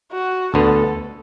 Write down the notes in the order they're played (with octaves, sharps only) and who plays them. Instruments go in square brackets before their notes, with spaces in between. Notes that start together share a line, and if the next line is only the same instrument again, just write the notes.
[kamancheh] F#4
[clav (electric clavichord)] D2 D3 B3 [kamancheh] A4